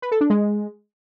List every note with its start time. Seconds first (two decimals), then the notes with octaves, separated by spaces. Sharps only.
0.02 B4
0.12 A4
0.21 D4
0.30 G#3